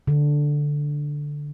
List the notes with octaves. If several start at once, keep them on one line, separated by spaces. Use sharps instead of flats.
D3